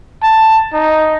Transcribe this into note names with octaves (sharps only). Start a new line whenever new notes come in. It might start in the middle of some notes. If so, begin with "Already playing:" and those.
A5
D#4